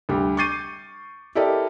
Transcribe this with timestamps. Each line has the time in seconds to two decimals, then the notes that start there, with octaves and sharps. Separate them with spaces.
0.09 D2 G3
0.37 C#6 D6 G6 A6 C7 D#7
1.35 E4 G4 A4 A#4 D5 D#5